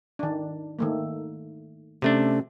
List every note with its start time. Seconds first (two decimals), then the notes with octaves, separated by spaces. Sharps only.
0.19 D#3 D4
0.79 D#3 A3 A#3
2.02 C3 A3 C#4 D4